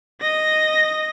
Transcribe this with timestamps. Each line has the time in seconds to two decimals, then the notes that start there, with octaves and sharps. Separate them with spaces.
0.22 D#5 A#6